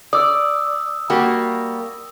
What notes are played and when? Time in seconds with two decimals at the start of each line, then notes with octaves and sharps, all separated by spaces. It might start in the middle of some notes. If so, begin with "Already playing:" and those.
0.13 D5 D#6 E6
1.10 G3 A#3 F#4